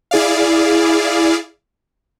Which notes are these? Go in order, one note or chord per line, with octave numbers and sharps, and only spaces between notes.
E4 G#4 D5 F5